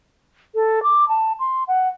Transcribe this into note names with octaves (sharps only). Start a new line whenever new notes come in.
A4
D6
A5
C6
F#5